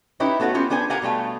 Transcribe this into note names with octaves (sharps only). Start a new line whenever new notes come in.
C#4 D#4 E4 G4 B4 C#5
A3 B3 F#4 C#5 F#5
B3 C#4 F4 G4
B3 D4 G#4 C5 G#5
G4 A#4 C5 F5 F#5 G#5
B2 G3 A3 F5